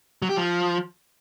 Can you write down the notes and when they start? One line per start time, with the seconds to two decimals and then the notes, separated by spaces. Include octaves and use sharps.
0.22 F#3
0.29 G4
0.36 F3